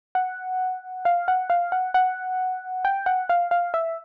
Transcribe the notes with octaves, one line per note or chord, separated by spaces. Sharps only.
F#5
F5
F#5
F5
F#5
F#5
G5
F#5
F5
F5
E5